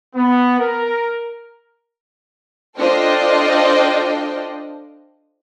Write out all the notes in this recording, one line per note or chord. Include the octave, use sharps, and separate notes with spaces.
B3
A#4
D4 F4 A4 C5 D#5 G5